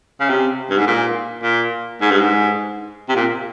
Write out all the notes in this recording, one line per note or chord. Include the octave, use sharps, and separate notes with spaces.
C#3
C3
G2
G#2
A#2
A#2
G#2
G2
G#2
C3
A#2